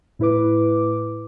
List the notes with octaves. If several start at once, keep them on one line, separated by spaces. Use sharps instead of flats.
A2 E4 B4 D6